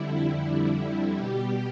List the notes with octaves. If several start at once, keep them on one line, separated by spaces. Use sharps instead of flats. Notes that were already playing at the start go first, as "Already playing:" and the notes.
Already playing: F2 D3 G3 E4
B2 G3 G4